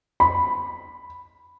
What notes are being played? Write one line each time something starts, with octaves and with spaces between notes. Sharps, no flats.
B5